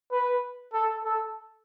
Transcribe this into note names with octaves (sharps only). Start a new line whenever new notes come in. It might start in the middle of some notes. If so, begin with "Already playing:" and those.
B4
A4
A4